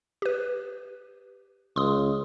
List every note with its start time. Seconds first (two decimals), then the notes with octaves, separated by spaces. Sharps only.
0.22 G4 B4
1.76 C#2 C6 D#6